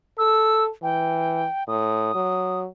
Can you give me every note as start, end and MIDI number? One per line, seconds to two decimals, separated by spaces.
0.18 0.70 69
0.18 0.64 88
0.83 1.46 52
0.83 1.64 79
1.68 2.12 45
1.68 2.60 87
2.15 2.67 54